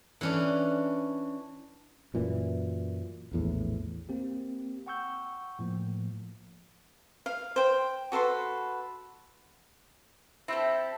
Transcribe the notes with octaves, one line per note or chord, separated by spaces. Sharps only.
E3 C#4 D4
F#2 A#2 E3
A#1 E2 A2
A#3 C4 G4
F#5 G5 C#6 E6 G6
A2 F3 A#3
F5
C5 G5
F#4 A4 B4 C6
C4 E4 G4 A4